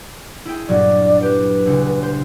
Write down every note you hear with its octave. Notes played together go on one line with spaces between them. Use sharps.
E4 G#4 G5
G2 A#2 F#3 D5
G4 B4
D2 C#3
C5